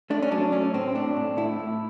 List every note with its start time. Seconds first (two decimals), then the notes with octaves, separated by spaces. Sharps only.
0.10 A3 D4
0.23 C#4
0.31 F#3 D4
0.52 A3 C#4
0.74 A2 C4
0.95 A2 D4
1.16 A2
1.37 A3 E4
1.59 A2